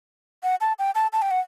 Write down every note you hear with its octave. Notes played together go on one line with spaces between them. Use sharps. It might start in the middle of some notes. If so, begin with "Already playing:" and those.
F#5
A5
G5
A5
A5
G5
F#5